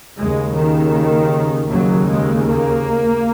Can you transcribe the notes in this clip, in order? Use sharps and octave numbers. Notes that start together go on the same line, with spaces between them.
D#2 C#3 G#3
D#3
D#2 C#3 F#3
G#3
A#3